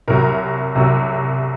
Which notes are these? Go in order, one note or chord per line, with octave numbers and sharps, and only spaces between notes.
C2 C3 F#3 A#4
C2 C3 F#3